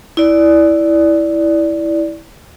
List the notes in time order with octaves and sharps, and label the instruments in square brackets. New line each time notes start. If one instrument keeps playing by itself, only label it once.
[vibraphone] E4 D5